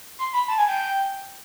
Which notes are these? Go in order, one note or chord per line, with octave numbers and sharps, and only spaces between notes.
C6
B5
A5
G#5
G5